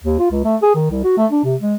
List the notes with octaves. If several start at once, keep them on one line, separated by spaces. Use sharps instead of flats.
D#2
F4
C#2
A3
G#4
D#3
C2
F#4
A3
D4
C3
G#3